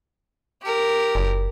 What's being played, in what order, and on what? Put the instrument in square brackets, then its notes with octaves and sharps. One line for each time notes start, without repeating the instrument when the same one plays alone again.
[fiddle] G4 A#4
[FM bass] F#1